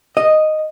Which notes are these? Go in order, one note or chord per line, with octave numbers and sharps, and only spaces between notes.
D#5